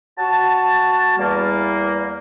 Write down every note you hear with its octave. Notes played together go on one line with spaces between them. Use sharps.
F#4 A5
E2 G3 A#3